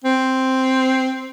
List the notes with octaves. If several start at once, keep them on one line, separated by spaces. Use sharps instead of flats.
C4